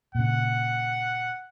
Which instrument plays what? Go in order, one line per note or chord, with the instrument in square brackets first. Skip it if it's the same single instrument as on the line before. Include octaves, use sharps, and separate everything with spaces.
[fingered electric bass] A#2 C#3 [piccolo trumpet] F#5